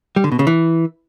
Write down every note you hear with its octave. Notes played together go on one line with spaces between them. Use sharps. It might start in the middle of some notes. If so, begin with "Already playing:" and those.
G3
D3
B2
C#3
E3